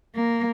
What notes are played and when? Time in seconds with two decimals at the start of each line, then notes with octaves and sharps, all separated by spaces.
0.15 A#3